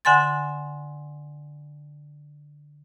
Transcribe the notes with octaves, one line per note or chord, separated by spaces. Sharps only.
D3 F#5 G#5 C6 A6